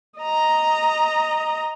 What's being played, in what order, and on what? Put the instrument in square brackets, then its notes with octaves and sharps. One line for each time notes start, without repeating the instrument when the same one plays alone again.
[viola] D#5 A#5